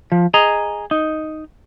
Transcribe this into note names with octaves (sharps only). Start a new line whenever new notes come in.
F3
G#4 D#5 A#5
D#4